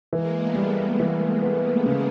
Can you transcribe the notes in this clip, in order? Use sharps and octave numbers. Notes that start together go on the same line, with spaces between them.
E3 G#3 A#3
A3 B3
G3
G#3 A#3
E3
B3
C#3